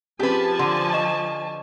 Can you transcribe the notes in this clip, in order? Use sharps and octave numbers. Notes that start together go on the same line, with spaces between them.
F3 C4 C#4 G4 G#4 B4 G#5 A5
D3 F#5 A#5 C6 D#7
D#5 C#6 E7